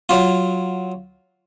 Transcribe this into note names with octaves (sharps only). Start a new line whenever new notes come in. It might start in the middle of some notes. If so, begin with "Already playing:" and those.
F#3 F4